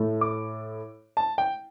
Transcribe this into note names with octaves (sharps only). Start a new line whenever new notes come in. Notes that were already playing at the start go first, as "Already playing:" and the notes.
Already playing: A2 A3
D6
A5
G5